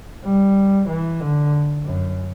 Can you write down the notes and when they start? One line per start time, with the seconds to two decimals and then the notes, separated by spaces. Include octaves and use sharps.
0.25 G3
0.88 E3
1.20 D3
1.84 F#2